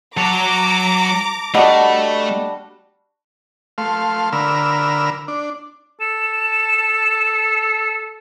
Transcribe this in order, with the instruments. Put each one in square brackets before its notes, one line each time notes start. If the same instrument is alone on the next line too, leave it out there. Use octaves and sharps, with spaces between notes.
[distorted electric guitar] F#3 C#5 [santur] A5 [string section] A#5 D6
[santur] G3 D4 F#4 [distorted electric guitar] A3 [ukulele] D#5 F#5
[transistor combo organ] A3 F5 C6
D3 A#4 B5 E6 F6
D4
[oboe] A4 [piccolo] E7